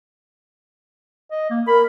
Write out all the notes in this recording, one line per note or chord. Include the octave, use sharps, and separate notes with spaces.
D#5
A#3
A#4 B5